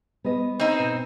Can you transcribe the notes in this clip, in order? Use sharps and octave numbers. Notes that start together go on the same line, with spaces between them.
B3 C5 D#5
C4 D#4
B2